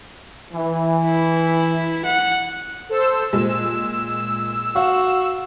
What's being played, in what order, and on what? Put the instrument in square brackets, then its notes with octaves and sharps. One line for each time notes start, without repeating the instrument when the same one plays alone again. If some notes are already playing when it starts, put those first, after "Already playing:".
[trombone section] E3
[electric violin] E4
F#5
[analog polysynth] A4 C5 E6
[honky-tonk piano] A#2 G#3 [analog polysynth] E6
[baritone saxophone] F#4 [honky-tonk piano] F5